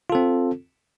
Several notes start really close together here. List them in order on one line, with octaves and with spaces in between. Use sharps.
F4 A4 C4